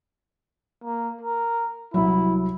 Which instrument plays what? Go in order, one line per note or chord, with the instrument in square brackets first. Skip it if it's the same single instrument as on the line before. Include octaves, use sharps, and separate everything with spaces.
[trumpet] A#3
A#4
[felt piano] C2 F#3 [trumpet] E4